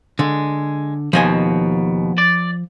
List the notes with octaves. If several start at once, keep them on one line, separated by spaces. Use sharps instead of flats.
D3 G#3
D#2 B2 F3 D#5 G#5
D5